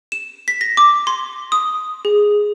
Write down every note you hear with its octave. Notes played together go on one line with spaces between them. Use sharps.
E7
B6
A#6
D6
C6
D#6
G#4